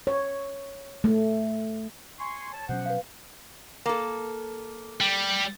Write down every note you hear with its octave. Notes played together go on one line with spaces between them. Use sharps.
C#5
A3
G#5 C6 C#6
C#5 A5
B2 F3 F#3 C#4 C5 F#5
B4 F5
A#3 A4
G3